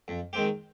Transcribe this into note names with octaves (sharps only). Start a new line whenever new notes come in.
F2
D#3 G#3 C4 G4